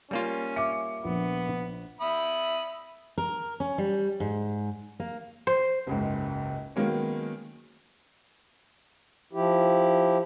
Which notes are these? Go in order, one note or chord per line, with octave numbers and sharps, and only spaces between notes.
G3 A#3 C#4 F4
E5 D6 C#7
A#1 B3
E5 B5 D#6
A#4
C#4
G3
G#2
A#3
C5
F#1 C#2 G#2
D#3 F#3 G#3 A#3 B3 C#4
F3 E4 G4